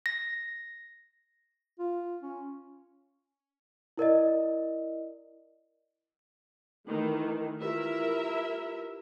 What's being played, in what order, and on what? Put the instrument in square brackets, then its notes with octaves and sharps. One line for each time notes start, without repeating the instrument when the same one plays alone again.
[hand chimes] A#6
[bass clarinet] F4
C#4
[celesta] E4 A#4 D5 D#5
[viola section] D#3 E3 A3
[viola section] E4 A#4 E5 [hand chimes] F4 G4 B4